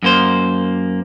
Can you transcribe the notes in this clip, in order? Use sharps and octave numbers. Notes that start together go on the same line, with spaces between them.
F#2 A#3 C5